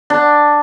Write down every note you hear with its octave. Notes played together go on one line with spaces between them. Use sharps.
D4